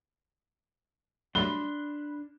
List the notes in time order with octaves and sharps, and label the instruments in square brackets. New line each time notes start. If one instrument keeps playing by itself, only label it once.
[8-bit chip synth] F#3 G3 A3 [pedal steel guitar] D4 C6 [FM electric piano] B5 F#6 [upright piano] G7